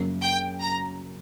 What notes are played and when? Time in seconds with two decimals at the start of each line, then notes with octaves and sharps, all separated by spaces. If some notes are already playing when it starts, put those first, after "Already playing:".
Already playing: F#2 C#3 F#3 A#3 C#4
0.22 G5
0.61 A#5